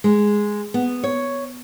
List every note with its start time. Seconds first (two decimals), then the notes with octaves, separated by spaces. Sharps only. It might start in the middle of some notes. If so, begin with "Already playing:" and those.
0.04 G#3
0.74 B3
1.04 C#5